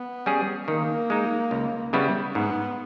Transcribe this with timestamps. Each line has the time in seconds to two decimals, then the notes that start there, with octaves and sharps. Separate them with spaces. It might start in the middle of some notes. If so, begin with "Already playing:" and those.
Already playing: B3
0.26 G3 C#4 G#4
0.68 D#3 A#3
1.10 G#3 D#4
1.51 C#2
1.93 C#3 G3 B3 E4
2.35 G#2 B3